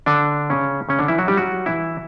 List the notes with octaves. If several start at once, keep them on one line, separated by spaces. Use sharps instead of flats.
D3 D4
C#3 C#4
C#3 C#4
D3 D4
E3 E4
F#3 F#4
G3 G4
F#3 F#4
E3 E4